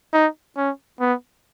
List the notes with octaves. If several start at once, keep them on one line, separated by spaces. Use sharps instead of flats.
D#4
C#4
B3